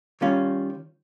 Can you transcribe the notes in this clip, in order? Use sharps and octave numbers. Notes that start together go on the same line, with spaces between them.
D#3 G3 C#4 F4